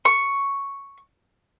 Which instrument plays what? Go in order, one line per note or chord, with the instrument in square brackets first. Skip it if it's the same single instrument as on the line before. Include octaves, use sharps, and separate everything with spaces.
[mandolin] C#6